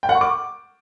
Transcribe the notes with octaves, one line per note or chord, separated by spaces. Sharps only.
G5
F#5
C#6
D6